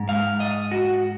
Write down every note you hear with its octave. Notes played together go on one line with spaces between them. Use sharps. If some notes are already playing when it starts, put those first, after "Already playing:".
Already playing: G#2 G#3
F5
D#5
F#4